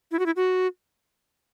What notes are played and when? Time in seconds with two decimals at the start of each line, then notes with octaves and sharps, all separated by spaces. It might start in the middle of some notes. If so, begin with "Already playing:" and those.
0.12 E4
0.19 F#4
0.26 E4
0.36 F#4